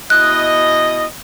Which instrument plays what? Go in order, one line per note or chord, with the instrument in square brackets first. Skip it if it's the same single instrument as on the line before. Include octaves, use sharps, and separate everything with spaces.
[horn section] B2 E4 D#5 [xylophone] F#6